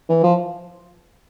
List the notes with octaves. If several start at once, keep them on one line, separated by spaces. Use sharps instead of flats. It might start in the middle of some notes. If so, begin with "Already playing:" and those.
E3
F3